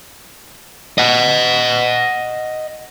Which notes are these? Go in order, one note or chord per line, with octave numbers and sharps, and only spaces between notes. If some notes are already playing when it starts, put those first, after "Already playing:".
D#5 F#5